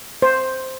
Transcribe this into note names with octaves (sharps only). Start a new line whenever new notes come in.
C5